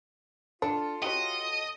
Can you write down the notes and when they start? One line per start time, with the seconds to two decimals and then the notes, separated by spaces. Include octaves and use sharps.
0.62 D4 F4 A4
1.02 C#4 F#4 G4 D#5